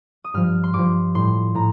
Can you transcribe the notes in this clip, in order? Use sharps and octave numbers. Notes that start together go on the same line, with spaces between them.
D#6
G2 F3 F6
C6
G2 F3 D6
A2 G3 C6
A2 A#5